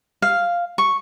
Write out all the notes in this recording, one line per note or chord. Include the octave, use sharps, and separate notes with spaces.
F5
C#6